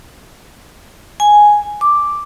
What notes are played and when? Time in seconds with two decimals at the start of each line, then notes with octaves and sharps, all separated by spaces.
1.20 G#5
1.81 D6